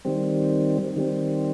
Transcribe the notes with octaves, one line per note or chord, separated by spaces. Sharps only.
D#3 G3 C4
D#3 G3 C4